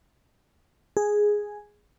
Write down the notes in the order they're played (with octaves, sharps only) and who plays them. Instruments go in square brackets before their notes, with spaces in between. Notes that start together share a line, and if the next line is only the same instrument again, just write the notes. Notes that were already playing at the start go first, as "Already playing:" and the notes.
[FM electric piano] G#4